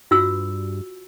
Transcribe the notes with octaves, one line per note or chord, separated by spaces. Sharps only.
G2 F4 F#4 E6